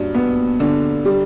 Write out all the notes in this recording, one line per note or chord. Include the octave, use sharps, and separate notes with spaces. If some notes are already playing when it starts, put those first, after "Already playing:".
Already playing: G2 F#3
B3
D3
G3